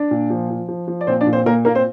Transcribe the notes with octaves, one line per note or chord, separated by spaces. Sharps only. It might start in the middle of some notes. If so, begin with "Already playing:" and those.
Already playing: D4 D5
A#2
F3
F3
F3
F3
D5
A#2 C4 C5
D4 D5
A#2
C4 C5
A#2 A#3 A#4
A#2 A#3 A#4
C4 C5